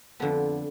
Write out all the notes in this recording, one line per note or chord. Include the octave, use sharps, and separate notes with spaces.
F2 D3 F3 B3